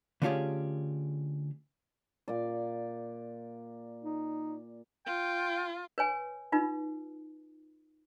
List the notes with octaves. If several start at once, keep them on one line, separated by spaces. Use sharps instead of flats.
D3 A3 C#4 F4 G4 G#4
A#2 D5
D#4
F4 G5
B4 C#5 G#5
D#4 F4 B4